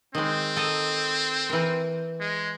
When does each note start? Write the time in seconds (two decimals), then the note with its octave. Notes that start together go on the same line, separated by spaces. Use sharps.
0.15 D#3 G#3 C4
0.57 A4 D#5 A#5
1.49 E3 A#4
2.20 G#3